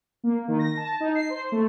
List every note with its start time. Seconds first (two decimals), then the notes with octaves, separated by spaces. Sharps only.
0.24 A#3
0.48 D#3
0.59 A#6
0.77 A5
1.00 D#4
1.15 C7
1.29 C5
1.52 A3